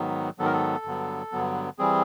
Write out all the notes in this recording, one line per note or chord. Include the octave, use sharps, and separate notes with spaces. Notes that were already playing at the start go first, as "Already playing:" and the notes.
Already playing: G#2 D#3 F#3 B3
G#2 D#3 F#3 B3 A4
A#4
A4
G2 D3 F#3 B3
G2 D3 F#3 B3
E3 G3 C4 G#4